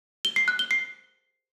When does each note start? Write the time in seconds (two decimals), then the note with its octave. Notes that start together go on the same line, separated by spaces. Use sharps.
0.25 G7
0.36 C7
0.48 F#6
0.59 G7
0.71 C7